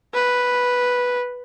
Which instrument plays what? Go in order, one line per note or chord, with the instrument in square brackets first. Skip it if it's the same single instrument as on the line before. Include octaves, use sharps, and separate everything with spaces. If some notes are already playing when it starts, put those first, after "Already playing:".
[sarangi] B4